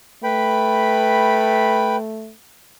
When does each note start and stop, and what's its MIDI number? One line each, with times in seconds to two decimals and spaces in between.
0.24 2.33 57
0.24 1.96 71
0.24 1.96 79
0.24 1.96 83